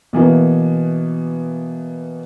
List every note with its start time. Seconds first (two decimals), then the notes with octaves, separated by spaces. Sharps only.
0.13 B2 E3 A#3 B3